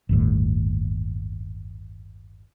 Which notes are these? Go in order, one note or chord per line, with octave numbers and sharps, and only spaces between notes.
G1 D#2 A2